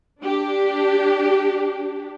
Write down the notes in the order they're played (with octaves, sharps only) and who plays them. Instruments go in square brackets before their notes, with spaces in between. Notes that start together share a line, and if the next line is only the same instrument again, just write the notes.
[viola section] D4 G4